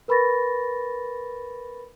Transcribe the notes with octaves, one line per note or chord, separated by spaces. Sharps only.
A#4 B4 B5 C#6 A6 A#6